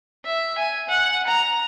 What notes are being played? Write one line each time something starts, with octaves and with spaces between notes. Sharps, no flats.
E5
G#5
F#5
A#5